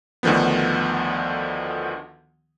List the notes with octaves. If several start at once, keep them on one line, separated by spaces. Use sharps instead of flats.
D2 D3 D#3 F3 B3